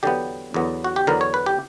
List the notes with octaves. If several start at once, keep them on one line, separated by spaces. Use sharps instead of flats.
E2 D3 F#3 B3 G4
E2 D3 F#3 B3
F#4
G4
E2 D3 F#3 B3 A#4
C#5
B4
G4